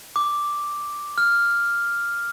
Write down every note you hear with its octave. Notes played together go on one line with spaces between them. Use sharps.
D6
F6